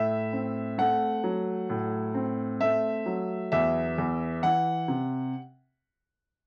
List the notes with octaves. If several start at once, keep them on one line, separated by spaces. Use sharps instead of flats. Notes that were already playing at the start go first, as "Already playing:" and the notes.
Already playing: A2 E5
C4
A3 F#5
F#3
A2
C4
A3 E5
F#3
E2 E5
E2
E3 F#5
C3